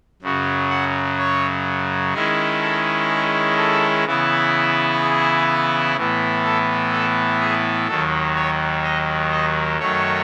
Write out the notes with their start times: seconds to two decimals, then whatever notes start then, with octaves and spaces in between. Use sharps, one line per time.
0.22 F#2 C#3 F#3
0.70 F#5
1.18 C#5
2.14 D#3 G#3 C#4 E4 G#4
2.61 A4
3.09 G#4
3.57 A4
4.05 C#3 E3 B3 E4
5.01 G#4
5.96 A2 E3 B3
6.44 A4
6.92 A4
7.40 G#4
7.88 D#2 D#3 F#3 A4
8.36 C#5
8.83 D#5
9.31 D#5
9.79 F#2 D#3 F#3 A3 C#5